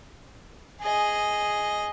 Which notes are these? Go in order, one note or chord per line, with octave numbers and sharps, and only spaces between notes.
G#4 D#5